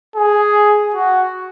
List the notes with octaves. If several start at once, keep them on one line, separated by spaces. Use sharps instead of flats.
G#4
F#4